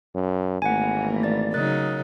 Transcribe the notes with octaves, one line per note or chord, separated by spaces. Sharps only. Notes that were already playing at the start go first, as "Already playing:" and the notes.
F#2
G#1 E3 A3 A#3 F#5 G#5
D5 A6
C#3 F#3 D#4 A#4 F#6 A6